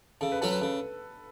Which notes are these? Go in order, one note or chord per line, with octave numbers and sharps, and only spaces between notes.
C#3 A4
B4
F#3 C#4 F#4 A4
B4
C#3 A4